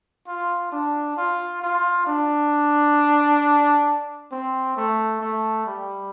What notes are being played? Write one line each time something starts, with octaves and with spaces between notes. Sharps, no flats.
F4
D4
F4
F4
D4
C4
A3
A3
G3